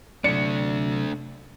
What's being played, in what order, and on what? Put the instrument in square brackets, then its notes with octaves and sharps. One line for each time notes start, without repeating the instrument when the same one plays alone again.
[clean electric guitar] C3 F#3 D5 [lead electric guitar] A3 D4 [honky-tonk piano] C#7